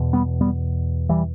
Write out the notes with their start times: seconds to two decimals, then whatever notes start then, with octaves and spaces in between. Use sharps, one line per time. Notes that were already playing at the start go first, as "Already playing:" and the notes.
Already playing: E2 B2
0.13 G3 B3
0.41 G3 B3
1.09 E3 G3